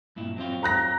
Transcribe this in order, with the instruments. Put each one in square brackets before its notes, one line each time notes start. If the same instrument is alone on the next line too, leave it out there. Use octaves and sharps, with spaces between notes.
[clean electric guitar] G2 A#2 E4
F#3 C4 F4
[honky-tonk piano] A#5 F#6 A#6